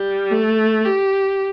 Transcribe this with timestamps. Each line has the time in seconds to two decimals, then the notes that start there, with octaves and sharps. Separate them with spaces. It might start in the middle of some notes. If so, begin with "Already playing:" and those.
Already playing: G3
0.31 A3
0.85 G4